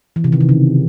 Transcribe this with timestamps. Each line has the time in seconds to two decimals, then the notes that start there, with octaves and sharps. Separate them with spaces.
0.16 E3
0.24 C3
0.32 D#3
0.41 C3
0.49 C#3